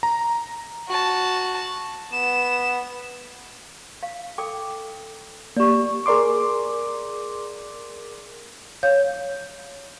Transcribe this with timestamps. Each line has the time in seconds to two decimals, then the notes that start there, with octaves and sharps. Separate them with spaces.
0.03 A#5
0.88 F#4 A5
2.12 B3 E7
4.03 F5
4.38 A4 G5 D6
5.57 A#3 G4 D5 C#6
6.06 G#4 A#4 D5 C6 D6
8.83 C#5 F5 G6